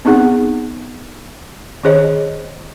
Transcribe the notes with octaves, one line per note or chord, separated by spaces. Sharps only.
B3 C4 D#4 G#4 F#5
D#3 C#4 G#4 C5 C#5 D#5